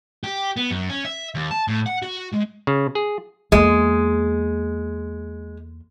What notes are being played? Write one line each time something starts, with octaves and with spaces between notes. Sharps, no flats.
G4
B3
F#2
C#4
E5
D#2
A5
A2
F#5
F#4
G#3
C#3
G#4
E2 G#3 A#3